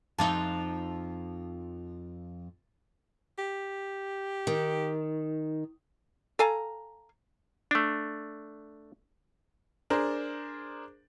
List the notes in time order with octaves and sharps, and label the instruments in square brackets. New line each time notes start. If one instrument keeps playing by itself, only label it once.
[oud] F2 F3 D#4 [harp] A5 D6 F#6
[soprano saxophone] G4
[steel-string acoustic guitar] D#3
[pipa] A4 F5 G#5 A#5
[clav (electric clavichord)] A3 D4
[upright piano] D4 G#4 A#4 C5